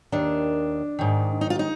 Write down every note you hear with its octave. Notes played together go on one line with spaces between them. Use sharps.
D#2 D#3 D4
G#2 D#3
D#4
F4
D#4